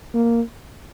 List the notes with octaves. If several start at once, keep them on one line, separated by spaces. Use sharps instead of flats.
A#3